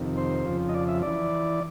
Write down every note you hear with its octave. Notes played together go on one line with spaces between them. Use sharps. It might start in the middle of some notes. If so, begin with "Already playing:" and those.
Already playing: F2 C3 D#3
C5
F2 C#3 F3
D#5
D5
E5
E3 D5